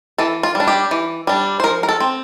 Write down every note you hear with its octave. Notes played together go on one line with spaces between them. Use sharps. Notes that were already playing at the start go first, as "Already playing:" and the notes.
E3 A4
F4
G3
D4
G4
E3
G3 D4
C5
F3 A#4
A#4
A4
C4